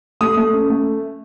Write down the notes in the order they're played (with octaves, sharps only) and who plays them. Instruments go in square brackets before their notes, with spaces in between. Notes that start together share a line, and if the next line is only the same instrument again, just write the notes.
[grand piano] A3 D#6
A3
C#4
A3